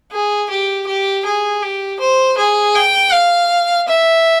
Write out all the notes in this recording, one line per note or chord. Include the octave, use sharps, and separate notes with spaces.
G#4
G4
G4
G#4
G4
C5
G#4
G5
F5
E5